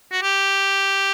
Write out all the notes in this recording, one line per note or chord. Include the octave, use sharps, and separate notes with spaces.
F#4
G4